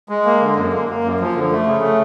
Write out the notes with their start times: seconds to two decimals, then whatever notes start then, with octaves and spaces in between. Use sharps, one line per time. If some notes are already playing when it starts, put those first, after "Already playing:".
0.09 G#3
0.25 A#3
0.41 D3
0.56 F#2
0.72 A#3
0.89 A#3
1.04 F#2
1.20 F3
1.35 D3
1.51 A3
1.66 C#3
1.82 A3